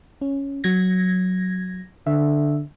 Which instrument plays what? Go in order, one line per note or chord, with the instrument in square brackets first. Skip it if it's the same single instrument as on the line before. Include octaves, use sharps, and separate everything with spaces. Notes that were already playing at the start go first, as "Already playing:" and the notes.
[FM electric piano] C#4
F#3 G#6 A#6
[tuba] D3 [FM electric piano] E5